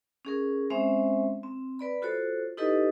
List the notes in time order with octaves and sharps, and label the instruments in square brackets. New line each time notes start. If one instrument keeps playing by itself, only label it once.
[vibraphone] C#4 G#4 A#4
G#3 C4 C#4 C5 E5
C4
B4 D5 B5
F4 F#4 A4 C5 C#5
D#4 E4 G4 A4 B4 D#5